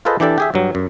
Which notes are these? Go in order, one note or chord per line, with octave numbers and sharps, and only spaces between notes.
F4 G#4 A4 B4 C5 D#5
E3 D4 G4 A4 D5
G4 G#4 E5
G2 F#3
F#2